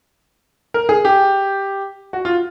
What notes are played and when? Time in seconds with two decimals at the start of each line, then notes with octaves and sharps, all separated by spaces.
0.74 A#4
0.89 G#4
1.05 G4
2.13 F#4
2.25 F4